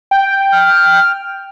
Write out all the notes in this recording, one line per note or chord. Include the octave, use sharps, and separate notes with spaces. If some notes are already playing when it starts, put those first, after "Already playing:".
G5
F6